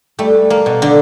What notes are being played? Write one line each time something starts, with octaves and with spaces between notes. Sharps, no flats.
G3 A3
A#3
B2
D3 D4